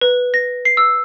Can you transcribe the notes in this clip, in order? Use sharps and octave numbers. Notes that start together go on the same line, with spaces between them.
B4
A#6
C7
E6